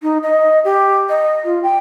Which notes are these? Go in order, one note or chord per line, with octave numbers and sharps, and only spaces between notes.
D#4
D#5
G4
D#5
F4
G5